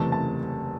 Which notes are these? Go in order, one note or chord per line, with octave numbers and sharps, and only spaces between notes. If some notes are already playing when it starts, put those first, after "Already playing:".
Already playing: F#1 E2 C3 E3 A3 A5
A5